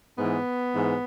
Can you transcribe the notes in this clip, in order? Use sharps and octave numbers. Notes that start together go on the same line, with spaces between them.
G#2 E3 B3
G#2 E3